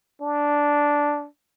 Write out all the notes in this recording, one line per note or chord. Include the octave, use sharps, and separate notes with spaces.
D4